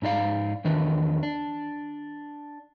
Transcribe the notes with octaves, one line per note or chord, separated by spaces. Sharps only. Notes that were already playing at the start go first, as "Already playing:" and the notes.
G#2 D#4 D5 F5
E2 D#3 D4 B4
D4